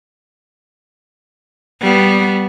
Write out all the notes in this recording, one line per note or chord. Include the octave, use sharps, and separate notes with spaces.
G3 B3